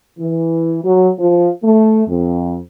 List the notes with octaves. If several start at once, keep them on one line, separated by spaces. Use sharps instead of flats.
E3
F#3
F3
A3
F2